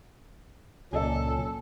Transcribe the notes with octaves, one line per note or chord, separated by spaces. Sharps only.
C#2 A#2 F#3 A#3 C#4 A4 D5 E5